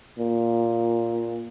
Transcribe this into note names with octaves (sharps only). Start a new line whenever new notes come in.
A#2